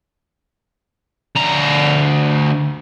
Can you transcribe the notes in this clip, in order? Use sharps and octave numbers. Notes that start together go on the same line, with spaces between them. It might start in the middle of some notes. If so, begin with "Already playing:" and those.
D2 A#5